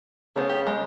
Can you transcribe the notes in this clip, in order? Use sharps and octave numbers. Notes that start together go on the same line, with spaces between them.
C#3 A3 B3 C5
G4
G#3